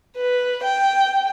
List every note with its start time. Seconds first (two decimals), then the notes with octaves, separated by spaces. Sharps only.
0.17 B4
0.64 G5